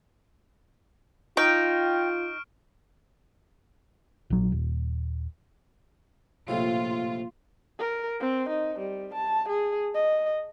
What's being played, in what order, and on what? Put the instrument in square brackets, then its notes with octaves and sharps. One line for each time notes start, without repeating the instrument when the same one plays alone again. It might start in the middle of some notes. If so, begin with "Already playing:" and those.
[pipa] D#4 [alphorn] F4 [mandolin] G5 [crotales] C#6 F6 D7
[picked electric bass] A#1 F#3
D#1
[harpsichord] A#1 A2 C3 [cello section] F4
[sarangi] A#4
C4
D#4
G3
A5
G#4
D#5